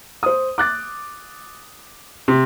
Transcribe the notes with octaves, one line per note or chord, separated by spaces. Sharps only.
C5 D#6
D6 F#6 A6
C3